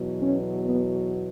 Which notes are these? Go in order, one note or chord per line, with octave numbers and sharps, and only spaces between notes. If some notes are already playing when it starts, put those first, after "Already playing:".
Already playing: E2 B2 F#3
C#4
B3